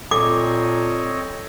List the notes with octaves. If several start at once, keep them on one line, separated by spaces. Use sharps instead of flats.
A#2 C4 A4 C#5 D#5 D6